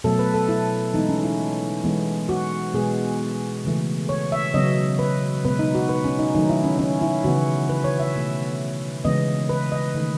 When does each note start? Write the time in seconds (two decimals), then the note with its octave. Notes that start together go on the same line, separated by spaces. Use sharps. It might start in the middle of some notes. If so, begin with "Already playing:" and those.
0.04 B2 F#3 A3 A4
0.19 B4
0.34 A4
0.49 E4
0.94 E3 G#3 B3 D#4
1.09 C#4
1.24 E4
1.84 E3 G#3 B3
2.29 F#4
2.74 B2 G#3 B3 G#4
3.65 C#3 E3 A3
4.09 C#5
4.32 E5
4.54 C#3 F#3 B3 D#5
4.99 B4
5.44 B2 G#3 B3 B4
5.59 D#4
5.75 F#4
5.89 B4
6.04 C#4
6.19 D#4
6.35 D#3 F#3 A3 D#4
6.50 E4
6.64 C#4
6.79 C#4
7.02 E4
7.24 C#3 E3 B3 F#4
7.69 B4
7.84 C#5
7.99 E5
8.15 B2 A3
9.05 C#3 E3 G#3 B3 D#5
9.49 B4
9.72 D#5
9.95 D#3 A3